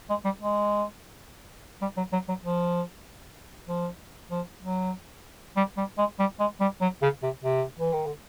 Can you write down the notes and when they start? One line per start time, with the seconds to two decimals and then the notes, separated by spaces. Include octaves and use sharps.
0.10 G#3
0.25 G3
0.41 G#3
1.82 G3
1.97 F#3
2.13 F#3
2.28 F#3
2.44 F3
3.68 F3
4.31 F3
4.63 F#3
5.56 G3
5.77 G3
5.98 G#3
6.19 G3
6.39 G#3
6.60 G3
6.81 F#3
7.02 C#3
7.23 C3
7.44 C3
7.79 E3
7.93 D#3
8.06 D3